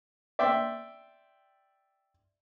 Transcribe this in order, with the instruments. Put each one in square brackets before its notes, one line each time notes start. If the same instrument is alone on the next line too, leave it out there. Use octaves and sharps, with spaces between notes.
[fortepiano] D5 E5 G5 C6 D6